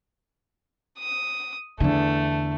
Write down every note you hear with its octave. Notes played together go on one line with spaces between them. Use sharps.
D#6
E2 D3 A3